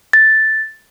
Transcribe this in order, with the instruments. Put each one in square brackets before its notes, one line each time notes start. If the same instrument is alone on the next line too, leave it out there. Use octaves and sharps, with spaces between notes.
[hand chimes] A6